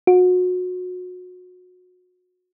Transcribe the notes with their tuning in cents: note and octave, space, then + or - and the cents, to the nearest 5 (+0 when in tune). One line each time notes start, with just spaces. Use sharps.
F#4 -30